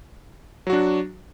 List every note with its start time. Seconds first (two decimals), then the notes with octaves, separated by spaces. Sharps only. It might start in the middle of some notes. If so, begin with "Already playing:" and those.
0.67 F#3
0.70 F#4
0.73 D4